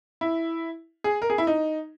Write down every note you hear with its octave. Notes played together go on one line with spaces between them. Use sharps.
E4
G#4
A#4
G#4
E4
D#4